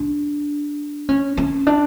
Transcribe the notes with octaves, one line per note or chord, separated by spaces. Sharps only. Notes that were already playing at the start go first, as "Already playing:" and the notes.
Already playing: D4
C#4
C#4
D4